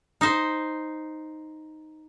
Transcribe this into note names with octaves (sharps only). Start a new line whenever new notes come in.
D#4 C5